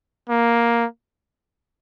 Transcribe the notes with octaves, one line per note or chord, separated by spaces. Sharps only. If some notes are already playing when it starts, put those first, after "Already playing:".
A#3